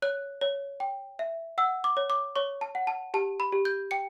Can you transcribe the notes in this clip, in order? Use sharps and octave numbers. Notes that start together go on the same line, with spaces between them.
C#5 F#6
C#5
G5
E5
F#5 E6
D6
C#5
D6
C#5 C#6
A5
F#5
A5
G4 A5
B5
G4
G6
G5 C#7